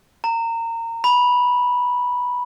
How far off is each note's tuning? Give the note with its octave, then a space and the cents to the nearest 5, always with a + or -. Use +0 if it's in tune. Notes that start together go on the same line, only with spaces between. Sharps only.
A#5 -25
B5 -10